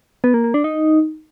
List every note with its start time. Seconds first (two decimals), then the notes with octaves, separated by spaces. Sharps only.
0.24 B3
0.34 A#3
0.44 A#3
0.54 D4
0.64 D#4